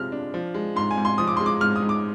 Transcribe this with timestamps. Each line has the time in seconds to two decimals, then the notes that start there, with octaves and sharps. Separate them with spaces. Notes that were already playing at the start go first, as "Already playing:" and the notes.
Already playing: C3 F3 G#3 F6
0.12 D4
0.34 F3
0.54 G#3
0.76 G#2 C6
0.91 G#5
0.98 G#2
1.05 C6
1.18 F3 D#6
1.28 D6
1.37 G#3 C6
1.46 D6
1.61 G#2 F6
1.76 D#6
1.82 G#2
1.89 D6